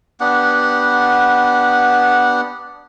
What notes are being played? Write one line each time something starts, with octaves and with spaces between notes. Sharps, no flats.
B3 D4 G4 F#5